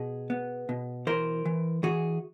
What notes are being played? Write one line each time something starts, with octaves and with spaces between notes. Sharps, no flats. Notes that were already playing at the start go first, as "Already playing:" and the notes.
Already playing: B2 G#4
B3
B2
E3 A#4 C5
E3
E3 F#4 G#4